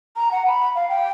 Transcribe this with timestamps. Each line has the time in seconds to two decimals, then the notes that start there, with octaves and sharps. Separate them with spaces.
0.16 A#5
0.31 F#5
0.47 B5
0.75 F5
0.89 G5